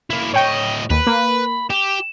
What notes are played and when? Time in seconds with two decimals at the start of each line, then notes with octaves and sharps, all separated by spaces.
0.10 A#3 E4
0.34 A2 C#5 D#5 G5 C#6
0.90 D#2 B4 B5
1.07 A#3
1.70 G4 E7